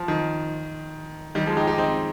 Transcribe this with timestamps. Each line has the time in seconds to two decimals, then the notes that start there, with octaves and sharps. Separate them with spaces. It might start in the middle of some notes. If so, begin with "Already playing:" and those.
Already playing: F3
0.08 D#3
1.35 D#3 G3
1.47 F3 G#3
1.57 D#4 G4
1.67 D#4 G4
1.78 C4 D#4